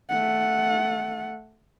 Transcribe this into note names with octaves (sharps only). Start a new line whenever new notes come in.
A3 F#5